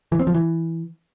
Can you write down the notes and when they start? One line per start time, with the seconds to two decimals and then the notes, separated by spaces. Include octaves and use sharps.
0.12 E3
0.19 C4
0.27 F3
0.34 E3